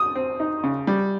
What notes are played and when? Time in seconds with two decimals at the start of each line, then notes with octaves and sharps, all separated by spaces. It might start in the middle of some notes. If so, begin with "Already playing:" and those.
Already playing: D#6
0.15 C4
0.40 D#4
0.64 C#3
0.87 G3